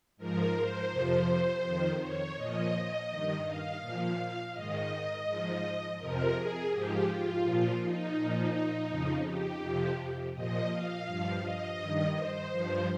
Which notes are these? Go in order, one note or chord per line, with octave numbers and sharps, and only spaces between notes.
G#2 F3 A#4
C5
F2 C3 F3
F2 D#3
C#5
A#2 F3 D#5
D#3
G2
F5
A#2 F3
G#2 D#3 D#5
G#2 F3
F2 C3 F3 A#4
G#4
G#2 F3 G4
F4
A#2 F3
D#4
A#2 F3
F2 C#3 F3
G4
F2 C3 F3
A#2 F3 D#5
F5
G2 F3
D#5
G2 D#3
C5
G2 F3